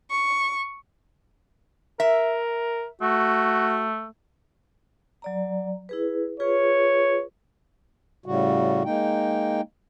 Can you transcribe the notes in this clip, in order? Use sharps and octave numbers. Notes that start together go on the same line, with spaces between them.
C#6
A#4 E5
A3 F#4
F#3 D5 A#5
E4 G#4 B4
F4 G#4 B4 C#5
A2 C#3 G3 F#4
G#3 A#3 D#4 G5